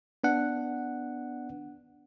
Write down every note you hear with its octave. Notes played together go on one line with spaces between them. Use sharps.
B3 D4 F#5